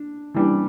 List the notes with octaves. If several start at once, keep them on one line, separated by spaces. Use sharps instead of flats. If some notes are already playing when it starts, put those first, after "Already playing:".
Already playing: D4
E3 G3 D4